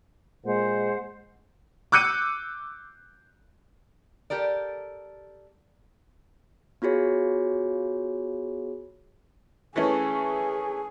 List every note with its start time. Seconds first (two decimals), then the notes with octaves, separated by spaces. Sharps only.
0.45 A#2 G#3 C5 F#5
1.92 D6 E6 F#6 G6 C#7 D#7
4.30 G4 A4 A#4 D5
6.82 B3 F4 F#4 G#4 C#5
9.76 E3 A3 C#4 G#4